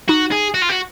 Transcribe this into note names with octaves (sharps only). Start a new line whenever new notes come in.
D#4 F#4
G#4
F#4
F4
F#4